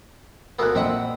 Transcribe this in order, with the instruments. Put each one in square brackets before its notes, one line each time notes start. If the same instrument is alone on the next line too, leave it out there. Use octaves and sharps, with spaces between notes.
[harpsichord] D2 A#3 B3 [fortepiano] E6 F#6
[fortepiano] A#1 D#5 [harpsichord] C4 E5 F#5